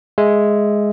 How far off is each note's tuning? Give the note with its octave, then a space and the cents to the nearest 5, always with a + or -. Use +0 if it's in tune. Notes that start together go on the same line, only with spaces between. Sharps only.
G#3 +0 E5 +0